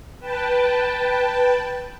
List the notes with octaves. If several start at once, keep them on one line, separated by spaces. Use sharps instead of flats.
B4 G5 A5